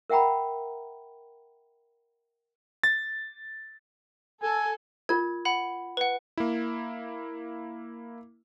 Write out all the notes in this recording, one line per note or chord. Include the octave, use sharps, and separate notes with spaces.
A#4 E5 F#5 G5 A#5 B5
A6
A4 G#5
F4 A#4 G#6
F#5 B5
B4 F#5
A#3 E4